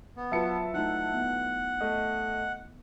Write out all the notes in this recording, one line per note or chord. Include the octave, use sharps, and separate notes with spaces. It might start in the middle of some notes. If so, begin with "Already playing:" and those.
B3
F#3 F4 B4 E5 A5 C#7
A3 D#4 E4 F#5
B3
A3 D#5